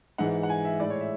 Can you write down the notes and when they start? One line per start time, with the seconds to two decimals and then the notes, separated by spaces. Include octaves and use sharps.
0.18 G#2 E3 G#3 F#5
0.43 F#5
0.50 G#5
0.65 E5
0.80 A2 G#3 D5
0.90 C#5
1.01 E5